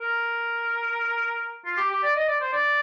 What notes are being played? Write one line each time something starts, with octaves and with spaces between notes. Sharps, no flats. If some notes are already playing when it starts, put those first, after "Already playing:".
A#4
F4
G4
G4
D5
D#5
D5
C5
D5